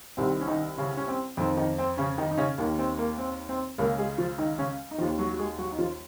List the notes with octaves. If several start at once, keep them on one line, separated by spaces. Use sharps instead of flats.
C2 C3 D#3 C4
C#4
D#3 D#4
C#3 C#4
C#4
C4
F2 D#3 C4
D#3 D#4
C4
C#3 C#4
D#3 D#4
D#4
C#3 C#4
D#2 D#3 A#3
C4
A#3
C4
C4
C#2 C#3 A#3 A#4
G#3 G#4
F3 F4
D#3 D#4
C#3 C#4
D#4
D#2 D#3 F3 F4
F#3 F#4
F#4
G#3 G#4
F#3 F#4
D#4
F3 F4